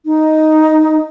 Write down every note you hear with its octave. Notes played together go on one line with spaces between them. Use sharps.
D#4